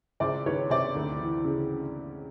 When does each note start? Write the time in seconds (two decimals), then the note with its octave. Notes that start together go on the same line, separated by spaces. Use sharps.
0.20 C#2 C5 D5
0.46 D#3 B4 C#5
0.70 C3 C5 D5
0.96 D2
1.21 E3
1.45 C#3